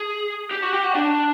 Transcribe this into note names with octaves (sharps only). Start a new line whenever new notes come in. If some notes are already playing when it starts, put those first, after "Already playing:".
Already playing: G#4
G4
F#4
G4
F#4
D4